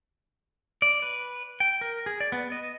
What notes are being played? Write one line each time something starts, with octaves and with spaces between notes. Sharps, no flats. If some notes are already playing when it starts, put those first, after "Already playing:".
D5
B4
G5
A#4
G#4
D5
B3
D#5